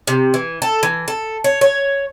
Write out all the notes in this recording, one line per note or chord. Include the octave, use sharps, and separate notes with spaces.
C3
E3
A4
E3
A4
C#5
C#5